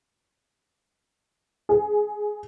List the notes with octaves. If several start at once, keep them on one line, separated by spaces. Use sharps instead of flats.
G#4